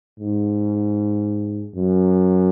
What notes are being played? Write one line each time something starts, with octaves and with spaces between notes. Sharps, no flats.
G#2
F#2